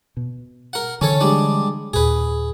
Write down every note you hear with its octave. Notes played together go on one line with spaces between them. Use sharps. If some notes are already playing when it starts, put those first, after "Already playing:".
B2
A#4 F#5
D3 E3 C#4 A4 C#5
G3 G#3 D4
D#2 A#2 G#4 B4